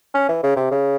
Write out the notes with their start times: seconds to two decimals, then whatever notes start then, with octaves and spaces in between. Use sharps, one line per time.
0.15 C#4
0.29 E3
0.43 C#3
0.56 C3
0.71 C#3